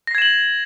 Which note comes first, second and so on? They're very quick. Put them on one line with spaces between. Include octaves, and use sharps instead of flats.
A#6 C7 G#6 E7 F#7